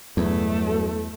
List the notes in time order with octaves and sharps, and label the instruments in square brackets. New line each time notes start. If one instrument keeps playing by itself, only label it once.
[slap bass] E2 [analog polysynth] G2 B2 F#3 [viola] A3 A4